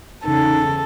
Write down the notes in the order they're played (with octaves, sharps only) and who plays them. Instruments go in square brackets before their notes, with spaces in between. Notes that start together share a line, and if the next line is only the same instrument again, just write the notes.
[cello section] E2 C#3 [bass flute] D#4 [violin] A4